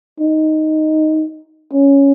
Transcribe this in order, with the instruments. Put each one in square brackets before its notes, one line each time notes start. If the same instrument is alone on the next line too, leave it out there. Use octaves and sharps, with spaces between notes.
[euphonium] D#4
C#4